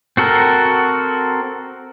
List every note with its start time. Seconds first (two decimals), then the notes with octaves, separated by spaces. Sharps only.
0.17 C4 F#4 A4 A#4